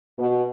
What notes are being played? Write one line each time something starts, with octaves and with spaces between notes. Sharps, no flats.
B2